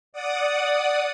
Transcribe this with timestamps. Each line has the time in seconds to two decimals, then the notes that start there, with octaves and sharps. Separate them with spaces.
0.13 D5 F#5 D#6